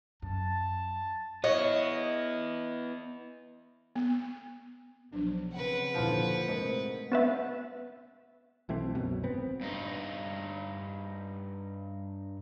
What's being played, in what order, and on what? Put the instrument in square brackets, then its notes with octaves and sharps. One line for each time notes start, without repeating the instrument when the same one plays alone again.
[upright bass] F#2 [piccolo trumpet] A5
[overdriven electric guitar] B3 E4 [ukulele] C#5 [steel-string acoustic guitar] D#5
[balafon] B3
[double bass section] B1 [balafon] F3 F#3 D4
[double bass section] C#3 C4 [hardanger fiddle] B4 F#5
[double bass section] A#1 D#2 D3 [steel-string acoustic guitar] F3 [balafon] E4 F5
[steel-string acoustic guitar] G#2 [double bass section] C3 [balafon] A3 A#4
[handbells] B3 B4 E5
[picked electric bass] B1 E3 A3 C4
C2 F#2 B2
G#1 B3 C4
[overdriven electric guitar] G2 D#4